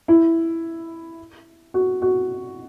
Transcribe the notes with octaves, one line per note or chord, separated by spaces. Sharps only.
E4
F#4
F#4